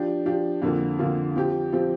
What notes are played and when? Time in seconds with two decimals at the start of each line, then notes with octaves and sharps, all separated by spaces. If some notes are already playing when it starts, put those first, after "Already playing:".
Already playing: F3 D4 G4
0.25 F3 D4 G4
0.62 F2 D3 A#3 F4
0.99 F2 D3 A#3 F4
1.36 F3 C4 G4
1.72 F3 C4 G4